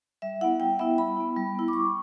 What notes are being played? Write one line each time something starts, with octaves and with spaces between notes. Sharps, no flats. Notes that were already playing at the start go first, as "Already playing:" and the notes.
G3 E5
B3 E4 F#5
G3 G5
B3 E4 E5
G3 B5
B3 E4
G3
B3 E4
D6
G3 C#6